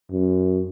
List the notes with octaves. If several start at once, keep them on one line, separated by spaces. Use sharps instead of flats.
F#2